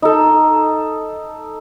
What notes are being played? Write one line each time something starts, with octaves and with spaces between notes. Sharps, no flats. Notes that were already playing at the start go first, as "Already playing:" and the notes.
D#4 A4